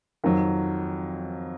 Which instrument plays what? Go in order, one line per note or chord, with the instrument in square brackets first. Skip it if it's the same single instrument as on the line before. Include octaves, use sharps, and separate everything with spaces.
[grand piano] F2 D#3 F#3